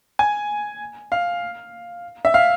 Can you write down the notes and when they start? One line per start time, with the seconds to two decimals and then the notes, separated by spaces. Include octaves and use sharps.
0.19 G#5
1.12 F5
2.25 E5
2.34 F5